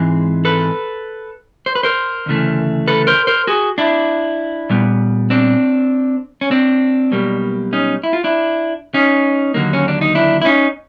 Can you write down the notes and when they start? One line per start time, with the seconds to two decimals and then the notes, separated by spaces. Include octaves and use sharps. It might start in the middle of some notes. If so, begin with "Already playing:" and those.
Already playing: G#2 E3 G#3 C4
0.45 A4 B4
1.66 C5
1.75 B4
1.83 A#4 C5
2.26 D2 C#3 E3 A3
2.88 A4 B4
3.07 A#4 C5
3.27 A#4 C5
3.47 F#4 G#4
3.78 D4 E4
4.70 A#2 G3 B3
5.30 C4 D4
6.41 C#4
6.51 C4 D4
7.11 B1 B2 G3 A#3
7.73 C#4 D#4
8.04 E4
8.13 F4
8.24 D4 E4
8.94 C#4 D#4
9.54 D#2 D3 F#3 A#3
9.73 C#4
9.88 D4
10.01 D#4
10.15 D4 E4
10.42 E4
10.45 C#4 D#4